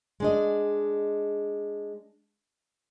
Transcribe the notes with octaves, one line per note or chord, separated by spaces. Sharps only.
G#3 D4 D#5